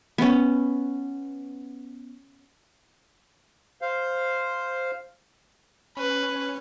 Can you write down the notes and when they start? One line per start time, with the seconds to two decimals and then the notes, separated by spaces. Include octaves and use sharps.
0.18 B3 C#4
3.82 C5 F5
5.97 C#4 B4